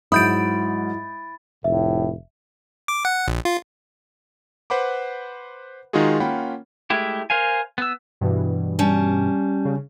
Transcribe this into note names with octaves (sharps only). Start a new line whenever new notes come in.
G#2 F#3 E4 B5 D#6 G6 A6 D7
F1 A2 E5
D6
F#5
A#1
F4
B4 C5 F#5 B5 D6
D#3 G#3 D#4 F4 F#4 G#4
A#3 C#4 F4 F#5 G5 B5
G#3 A3 E4 G4
A#4 C5 F5 G#5
B3 E6
G2 B2 E3
G3 C#4 A5
C#3